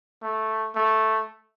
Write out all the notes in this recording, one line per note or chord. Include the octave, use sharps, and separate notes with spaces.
A3
A3